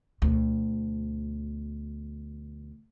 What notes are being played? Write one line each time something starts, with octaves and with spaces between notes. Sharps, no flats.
D2 B2